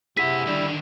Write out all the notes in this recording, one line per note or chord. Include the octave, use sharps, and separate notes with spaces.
C3 E4 G#4 F#5 B6
D3 D#3 G3